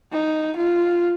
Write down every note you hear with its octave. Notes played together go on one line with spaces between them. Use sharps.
D#4
F4